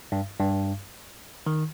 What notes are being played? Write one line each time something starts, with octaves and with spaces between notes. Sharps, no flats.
G2
G2
D#3